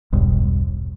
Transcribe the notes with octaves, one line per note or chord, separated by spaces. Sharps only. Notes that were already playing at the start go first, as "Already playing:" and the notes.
E1 B1 G2